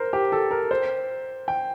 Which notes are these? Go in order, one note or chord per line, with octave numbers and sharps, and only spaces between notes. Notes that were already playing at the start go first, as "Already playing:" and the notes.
Already playing: A#4 C5
G4
A4
A#4
C5
G5